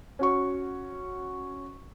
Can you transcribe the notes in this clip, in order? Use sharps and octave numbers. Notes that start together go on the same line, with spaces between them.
C#4 F#4 C#6